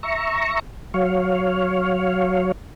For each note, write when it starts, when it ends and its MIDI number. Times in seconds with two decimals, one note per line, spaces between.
0.03 0.60 76
0.03 0.60 82
0.03 0.60 85
0.94 2.52 54
0.94 2.52 73
0.94 2.52 77